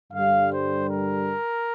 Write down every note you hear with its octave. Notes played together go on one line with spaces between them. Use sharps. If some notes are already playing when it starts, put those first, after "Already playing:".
G2 D3 G3 F5
C5
A#4